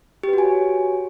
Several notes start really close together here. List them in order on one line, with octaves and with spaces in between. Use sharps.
G4 B4 F#4 G#5 C#5